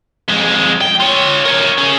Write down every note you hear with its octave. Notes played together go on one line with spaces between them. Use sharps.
F2 G#3
G5
F4 C#5
A#4 C#5
C#4 G#4